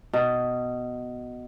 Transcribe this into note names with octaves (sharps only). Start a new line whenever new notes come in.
B2